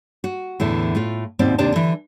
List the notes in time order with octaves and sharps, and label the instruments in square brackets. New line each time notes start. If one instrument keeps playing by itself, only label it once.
[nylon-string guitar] F#4
E2 A2 D3 E3
A2 A3 F4
D#2 G#2 B2 C4 D5
D#2 C3 D4 D5 A5
D3 E3